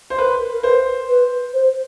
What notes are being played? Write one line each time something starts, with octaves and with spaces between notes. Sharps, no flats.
C5
A#4 B4
A#4
B4 C5
B4
C5